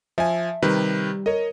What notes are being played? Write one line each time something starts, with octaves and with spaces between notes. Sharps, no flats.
F3 E5 G#5
C3 D#3 G3 B4
A#4 C#5 D#5